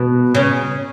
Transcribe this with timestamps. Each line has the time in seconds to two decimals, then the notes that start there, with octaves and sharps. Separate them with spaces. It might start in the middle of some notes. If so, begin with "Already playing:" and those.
Already playing: B2
0.35 C#3